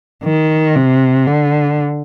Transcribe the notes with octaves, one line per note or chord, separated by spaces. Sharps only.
D#3
C3
D3